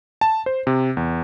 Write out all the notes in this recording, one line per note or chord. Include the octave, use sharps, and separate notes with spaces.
A5
C5
C3
E2